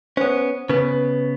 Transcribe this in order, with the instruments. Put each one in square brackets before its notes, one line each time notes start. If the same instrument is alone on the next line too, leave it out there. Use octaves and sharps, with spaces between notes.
[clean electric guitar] B3 C#4 [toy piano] C5
[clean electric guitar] C#3 B3 [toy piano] B4